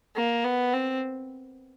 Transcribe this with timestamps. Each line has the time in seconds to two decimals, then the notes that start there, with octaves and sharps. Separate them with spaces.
0.16 A#3
0.44 B3
0.73 C4